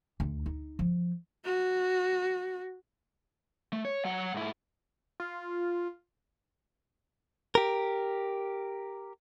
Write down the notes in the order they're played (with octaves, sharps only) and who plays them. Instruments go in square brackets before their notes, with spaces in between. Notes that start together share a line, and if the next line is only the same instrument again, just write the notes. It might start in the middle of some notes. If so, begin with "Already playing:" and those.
[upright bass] D2
D#4
F3
[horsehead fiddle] F#4
[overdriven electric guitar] A3
C#5
F#3 F#5
G#2 E4
[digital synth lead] F4
[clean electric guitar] G4 A#4